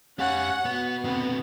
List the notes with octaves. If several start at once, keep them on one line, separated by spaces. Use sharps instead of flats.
C#4 G4 F5 F#5
B2 B3 B4
D3 B3 C4